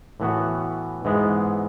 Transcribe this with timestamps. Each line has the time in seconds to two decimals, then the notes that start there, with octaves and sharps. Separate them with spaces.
0.20 A2 E3 B3 F#4
1.05 G#2 E3 G#3 B3